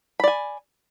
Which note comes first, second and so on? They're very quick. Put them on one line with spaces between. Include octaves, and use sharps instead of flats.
B5 D5 G#5